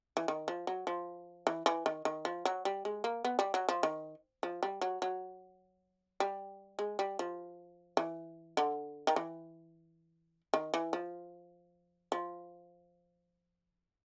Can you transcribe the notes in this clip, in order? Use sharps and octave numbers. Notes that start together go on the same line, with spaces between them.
E3
D#3
F3
F#3
F3
E3
E3
D#3
D#3
F3
F#3
G3
G#3
A#3
B3
G3
F#3
F3
D#3
F3
G3
F#3
F#3
G3
G#3
G3
F3
E3
D3
D#3
E3
D#3
E3
F3
F3